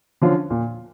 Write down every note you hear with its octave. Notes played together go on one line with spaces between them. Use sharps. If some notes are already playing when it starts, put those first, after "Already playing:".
D3 F3 C#4 F4
A#2